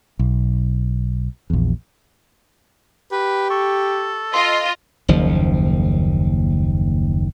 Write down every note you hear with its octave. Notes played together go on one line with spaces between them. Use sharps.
B1
A#1 E2
G4 B4
A4 C#6
F4 D#5 C6
F#1 D#2 F3